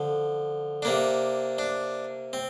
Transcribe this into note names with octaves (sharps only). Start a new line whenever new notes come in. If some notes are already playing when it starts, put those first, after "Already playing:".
Already playing: D3 F3
C3 A#3 D4
D4
C4